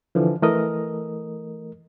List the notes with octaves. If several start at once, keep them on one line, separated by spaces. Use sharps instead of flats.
D3 E3 F3
E3 A3 A#4 D#5